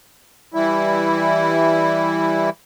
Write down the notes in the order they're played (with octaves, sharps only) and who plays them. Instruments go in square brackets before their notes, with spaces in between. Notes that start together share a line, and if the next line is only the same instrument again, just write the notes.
[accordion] E3 G3 E4